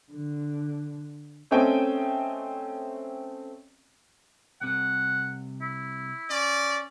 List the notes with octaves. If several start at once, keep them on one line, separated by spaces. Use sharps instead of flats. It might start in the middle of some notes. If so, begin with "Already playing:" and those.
D3
A3 C4 C#4 D#5 G5
C2 C3 F#5
E4
C#4 D5